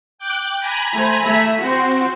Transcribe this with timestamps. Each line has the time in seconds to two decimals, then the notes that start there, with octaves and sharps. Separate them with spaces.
0.19 G5 D6 F#6
0.60 G#5 A#5 B5
0.93 A3 C5
1.22 A3 E5
1.61 C4 F#4 C5